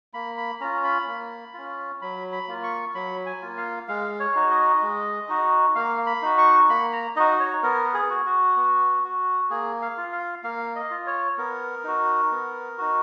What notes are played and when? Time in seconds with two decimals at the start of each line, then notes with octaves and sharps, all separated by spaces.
0.14 A#3 B5
0.37 B5
0.60 C#4 F4 A#5
0.84 B5
1.07 A#3
1.54 C#4 F4
2.02 F#3 B5
2.32 B5
2.48 A#3 F4
2.63 C#6
2.95 F#3 B5
3.26 G#5
3.42 A#3 F4
3.57 F5
3.88 G#3 F5
4.20 C#5
4.35 D#4 F#4
4.51 D#5
4.82 G#3
5.29 D#4 F#4
5.75 A#3 F5
6.07 B5
6.22 D#4 F#4
6.38 C#6
6.69 A#3 B5
6.93 A#5
7.16 D#4 F#4 D#5
7.40 C#5
7.63 B3 A#4
7.94 G#4
8.10 F#4
8.26 F#4
8.57 B3
9.03 F#4
9.50 A#3 G#4
9.82 F5
9.97 F4
10.13 F5
10.44 A#3 F5
10.76 D#5
10.91 F4
11.06 C#5
11.38 B3 A#4
11.84 D#4 F#4
12.31 B3
12.78 D#4 F#4